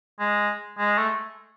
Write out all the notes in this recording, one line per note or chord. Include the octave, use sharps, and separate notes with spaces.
G#3
G#3
A3